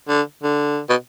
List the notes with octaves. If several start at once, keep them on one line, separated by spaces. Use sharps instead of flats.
D3
D3
B2